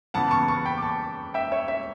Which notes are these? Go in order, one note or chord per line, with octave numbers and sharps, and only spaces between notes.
C#3 E3 B3 F#5 A5
A5 C#6
A5 C#6
G5 B5
D6
A5 C#6
E5 G5
C#5 E5
C#5 E5